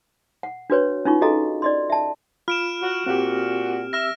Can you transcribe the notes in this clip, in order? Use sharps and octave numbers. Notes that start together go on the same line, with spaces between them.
F#5
D4 F#4 B4 C#5
C#4 D#4 F4 C#6
F#4 G#4 A4 D#5 F5 A#5
D5 D#5 C6
E5 A5
F4 B5 F6 D7 E7
F#4
A#2 C4 F#4 G4
E5 F6 A#6